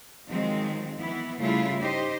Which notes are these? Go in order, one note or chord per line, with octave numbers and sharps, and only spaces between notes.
D#3 F3 F#3 G#3 C4
E3 B3 E4
C#3 G3 A3 E4 F4
D#4 G4 C5 D#5